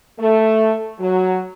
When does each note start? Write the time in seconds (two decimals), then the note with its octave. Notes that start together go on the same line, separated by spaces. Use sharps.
0.19 A3
1.00 F#3